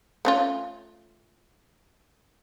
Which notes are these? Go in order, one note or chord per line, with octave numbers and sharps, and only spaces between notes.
A3 C#4 F4